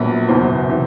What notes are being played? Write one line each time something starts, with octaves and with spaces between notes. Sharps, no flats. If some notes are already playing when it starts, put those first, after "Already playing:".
Already playing: A#1 A#2 F#3 B3
F#1 E2 B2 F#3 B3 C5
C3 E3